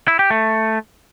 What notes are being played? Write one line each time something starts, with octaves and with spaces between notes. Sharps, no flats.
E4
G4
A3